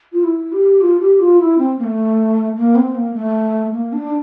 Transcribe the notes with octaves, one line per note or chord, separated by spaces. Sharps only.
F4
E4
G4
F4
G4
F4
E4
C4
A#3
A3
A#3
C4
A#3
A3
A#3
D4